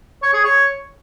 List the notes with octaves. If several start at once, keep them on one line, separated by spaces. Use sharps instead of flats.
C#5
G#4
C#5